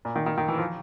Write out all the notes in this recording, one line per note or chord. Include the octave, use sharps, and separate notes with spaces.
A#2
D#3
D#3
D#3
E3
F3